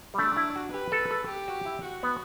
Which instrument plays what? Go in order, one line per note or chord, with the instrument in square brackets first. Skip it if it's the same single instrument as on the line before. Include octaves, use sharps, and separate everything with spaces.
[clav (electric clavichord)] G3
[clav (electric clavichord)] A3 [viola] D4
[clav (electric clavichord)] E4
F#4
[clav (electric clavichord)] G4 [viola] B4
[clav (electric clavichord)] A4
A4
[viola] G4
[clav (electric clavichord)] F#4
E4
[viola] F#4
[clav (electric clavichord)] B3